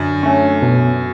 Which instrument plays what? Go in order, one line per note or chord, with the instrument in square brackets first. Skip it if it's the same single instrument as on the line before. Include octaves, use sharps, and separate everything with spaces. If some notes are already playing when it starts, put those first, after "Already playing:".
Already playing: [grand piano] F#2 [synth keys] D3
[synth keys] A3 C#4
B2